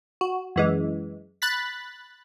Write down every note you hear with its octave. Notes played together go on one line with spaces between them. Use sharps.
F#4
F#2 E3 G#3
B5 F#6 A6 B6